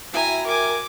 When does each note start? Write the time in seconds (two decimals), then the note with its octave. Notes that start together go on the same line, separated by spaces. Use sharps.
0.13 E4 F#4 E5 G5 G#5 A#5
0.46 A#4 G#5 D6